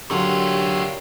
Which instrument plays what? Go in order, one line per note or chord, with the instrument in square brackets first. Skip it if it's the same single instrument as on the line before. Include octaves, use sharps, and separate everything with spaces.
[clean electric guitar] D3 F#3 [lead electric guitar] A3 F4 [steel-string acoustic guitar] D4 A#4 C#5 [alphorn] G4